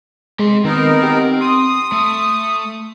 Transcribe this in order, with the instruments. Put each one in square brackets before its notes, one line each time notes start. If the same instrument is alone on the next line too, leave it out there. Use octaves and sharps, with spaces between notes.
[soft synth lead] G#3 [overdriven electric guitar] G4 C6
[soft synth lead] D#3 [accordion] B3 D#4 A#4 [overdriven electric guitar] C4
[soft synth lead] G4
[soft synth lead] C6 [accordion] D#6
[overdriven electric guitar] A3